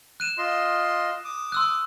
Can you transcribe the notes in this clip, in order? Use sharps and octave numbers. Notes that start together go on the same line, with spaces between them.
F#6 D#7 E7
F4 D#5 C6
D6 D#6
C6 E6 F#6